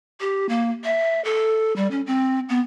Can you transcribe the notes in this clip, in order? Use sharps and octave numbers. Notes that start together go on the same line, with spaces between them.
G4
A#3
E5
A4
G3
C#4
C4
B3